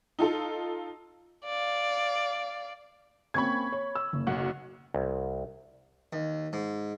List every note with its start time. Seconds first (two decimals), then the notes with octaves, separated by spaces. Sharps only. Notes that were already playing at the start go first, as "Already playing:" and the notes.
0.19 D#4 F4 A4
1.44 D5 F5
3.34 A#3 C4 C#4 B5 C#6 G#6
3.72 C#5
3.95 E6
4.13 F#1
4.27 B1 F#5
4.94 C2
6.13 D#2
6.53 G#2